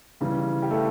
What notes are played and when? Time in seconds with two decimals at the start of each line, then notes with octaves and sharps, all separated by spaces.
0.21 C#3 E3 G3
0.62 G4
0.71 A3 A4